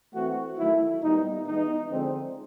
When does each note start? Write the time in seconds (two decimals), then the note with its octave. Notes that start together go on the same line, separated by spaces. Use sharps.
0.14 E3 A3 C4 F#4
0.58 D#3 F#3 A3 E4
1.02 A#2 G3 B3 D#4
1.47 E3 G#3 B3 D#4
1.90 D3 F3 G#3 C4